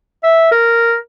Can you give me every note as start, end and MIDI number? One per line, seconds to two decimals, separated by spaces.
0.24 0.49 76
0.52 0.96 70